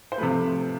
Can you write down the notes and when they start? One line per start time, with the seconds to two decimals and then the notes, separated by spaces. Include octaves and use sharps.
0.12 C5
0.18 A3 B4
0.21 C3 F3